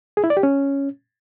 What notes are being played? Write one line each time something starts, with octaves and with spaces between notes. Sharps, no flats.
G#4
E4
D5
G4
C#4